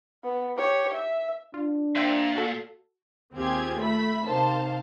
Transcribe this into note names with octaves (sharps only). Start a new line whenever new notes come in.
B3
G4 C#5
E5
D4 F4
A#2 C5 E5 G5
F#4 A4
D#2 C4 F4 G4 G#4 G#6
A3 E5 B5 B6
C3 D#3 C5 F5 A5